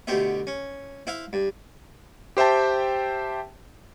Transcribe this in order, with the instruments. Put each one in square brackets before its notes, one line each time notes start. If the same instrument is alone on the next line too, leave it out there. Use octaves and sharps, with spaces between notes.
[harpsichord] D2 B2 G4 C5 E5
C#4
E4 C5 E5 F5
G2
[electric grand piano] G4 C5 E5 G5 A5